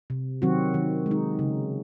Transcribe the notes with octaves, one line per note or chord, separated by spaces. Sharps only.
C3
D#3 F#3 C4 F#4
D#3
G#3
D#4
C#3